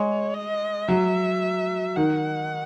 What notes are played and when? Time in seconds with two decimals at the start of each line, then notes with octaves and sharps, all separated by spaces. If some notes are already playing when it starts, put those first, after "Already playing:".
Already playing: G#3 C#5
0.34 D#5
0.88 F#3 E5
1.96 D#3 F#5